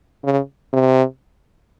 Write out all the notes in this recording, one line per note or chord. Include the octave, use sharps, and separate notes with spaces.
C#3
C3